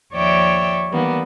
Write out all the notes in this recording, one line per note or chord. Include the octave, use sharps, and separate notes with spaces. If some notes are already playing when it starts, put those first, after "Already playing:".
D#2 F3 C#5 D5 E5 G5
D#3 E3 G3 A#3 B3